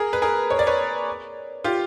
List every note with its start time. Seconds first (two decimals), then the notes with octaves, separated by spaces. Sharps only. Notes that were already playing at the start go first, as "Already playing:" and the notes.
Already playing: G#4 A#4
0.13 B4
0.22 G#4 A#4
0.50 C#5
0.59 D5
0.67 B4 C#5
1.64 F4 G4